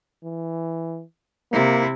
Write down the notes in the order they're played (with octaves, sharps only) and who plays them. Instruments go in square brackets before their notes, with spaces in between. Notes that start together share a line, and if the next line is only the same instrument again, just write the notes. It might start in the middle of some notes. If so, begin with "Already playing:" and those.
[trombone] E3
[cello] C3 E4 [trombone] A#3